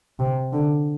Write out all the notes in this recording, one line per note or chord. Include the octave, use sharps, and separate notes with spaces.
C3
D3